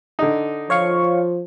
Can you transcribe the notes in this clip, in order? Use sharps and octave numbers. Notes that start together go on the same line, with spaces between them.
D3 D#4
F3 C#5 F5 C#6